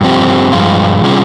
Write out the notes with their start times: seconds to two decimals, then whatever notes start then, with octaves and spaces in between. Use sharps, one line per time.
0.01 G2 F3 C4 G4
0.52 G2 F3 G#3 F4
1.03 C3 G3 C#4 F4 G#4